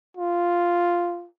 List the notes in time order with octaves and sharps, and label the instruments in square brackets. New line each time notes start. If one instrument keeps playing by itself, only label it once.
[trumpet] F4